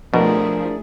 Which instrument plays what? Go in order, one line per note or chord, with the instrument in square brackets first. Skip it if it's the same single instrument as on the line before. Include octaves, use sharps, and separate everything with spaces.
[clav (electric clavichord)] B2 [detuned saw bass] F3 [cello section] A3 E4 G#4 [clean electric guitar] D4 A#4